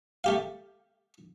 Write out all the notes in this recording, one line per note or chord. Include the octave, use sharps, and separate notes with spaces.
A3 G4 F5